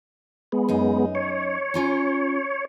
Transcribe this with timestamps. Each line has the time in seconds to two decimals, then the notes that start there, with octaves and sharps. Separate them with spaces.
0.52 G#3 B3
0.69 F#2 D#4
1.15 C#5
1.74 C#4 F4 A#5